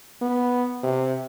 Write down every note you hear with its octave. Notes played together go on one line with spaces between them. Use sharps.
B3
C3